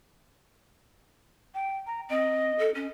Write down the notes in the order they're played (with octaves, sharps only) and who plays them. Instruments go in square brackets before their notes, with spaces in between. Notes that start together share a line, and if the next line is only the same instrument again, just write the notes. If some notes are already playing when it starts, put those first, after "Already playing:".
[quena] G5
A#5
[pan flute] C4 [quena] D#5
[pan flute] A4
C#4